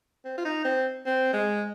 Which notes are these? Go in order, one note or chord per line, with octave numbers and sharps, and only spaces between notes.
C4
F4
D#4
C4
C4
G#3